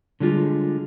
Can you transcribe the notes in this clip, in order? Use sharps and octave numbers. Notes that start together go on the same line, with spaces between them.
D3 G3 G#3 F4